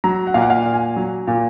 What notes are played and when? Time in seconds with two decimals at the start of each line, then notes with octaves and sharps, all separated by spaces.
0.04 F#3 A#5
0.27 F#5
0.34 A#2 F5
0.42 F#5
0.50 F5
0.66 A#2
0.73 G#5
0.96 F#3
1.27 A#2